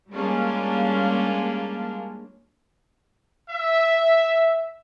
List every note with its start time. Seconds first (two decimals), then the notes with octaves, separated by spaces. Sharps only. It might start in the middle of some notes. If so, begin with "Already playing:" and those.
0.12 G3 G#3 A#3 C#4 D4 F4
3.50 E5